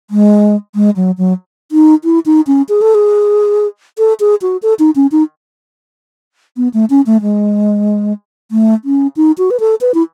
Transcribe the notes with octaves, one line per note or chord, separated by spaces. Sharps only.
G#3
G#3
F#3
F#3
D#4
E4
D#4
C#4
G#4
A4
G#4
A4
G#4
F#4
A4
D#4
C#4
D#4
B3
A3
C#4
A3
G#3
A3
C#4
D#4
F#4
B4
A4
B4
E4